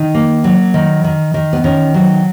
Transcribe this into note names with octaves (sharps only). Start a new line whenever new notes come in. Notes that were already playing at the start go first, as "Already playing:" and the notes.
Already playing: D#3 D#4
A#3
F#3
D#3
D#3
D#3
B3
D#3 C#4
F#3